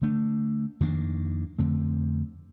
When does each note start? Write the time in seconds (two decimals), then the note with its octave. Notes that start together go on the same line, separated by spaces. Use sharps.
0.02 D3 A3 D4
0.80 F2 D#3 A#3 D4
1.59 F2 D3 A3 C4